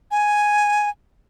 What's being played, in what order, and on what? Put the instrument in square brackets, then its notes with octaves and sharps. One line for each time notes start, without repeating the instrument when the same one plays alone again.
[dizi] G#5